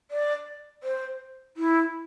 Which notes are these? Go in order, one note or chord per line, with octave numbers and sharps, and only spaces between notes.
D5
C5
E4